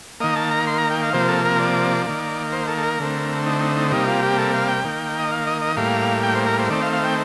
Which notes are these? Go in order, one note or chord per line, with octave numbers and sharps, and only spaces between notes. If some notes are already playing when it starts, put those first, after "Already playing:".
D#3 A#3 D#5
A5
A#5
C6
A#5
G5
F5
C3 F3 A#3 C5
A4
A#4
D5
D#3 A#3
C5
A4
A4
A#4
D3 A3 C4
D#4
D#4
D#4
C3 G3 A#3 D#4
F4
G4
A4
F5
G5
D#3 A#3
D#5
F5
D#5
D#5
A2 G3 A#3 F5
G5
C5
A#4
C5
D#3 A3 C4 D5
F5
F5
G5